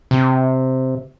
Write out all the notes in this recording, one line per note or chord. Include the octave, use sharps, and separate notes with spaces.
C3